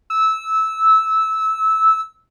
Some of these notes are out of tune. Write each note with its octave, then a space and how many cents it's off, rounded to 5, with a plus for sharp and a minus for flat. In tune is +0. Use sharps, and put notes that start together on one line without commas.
E6 -15